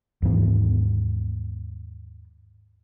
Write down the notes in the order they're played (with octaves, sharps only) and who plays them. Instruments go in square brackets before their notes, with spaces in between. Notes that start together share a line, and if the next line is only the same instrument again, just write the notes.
[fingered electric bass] D#2 G#2 E3 B3